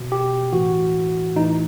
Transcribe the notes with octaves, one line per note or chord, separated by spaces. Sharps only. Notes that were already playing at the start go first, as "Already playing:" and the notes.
Already playing: B2
G4
A2 E3 F#4
A2 E3 D#4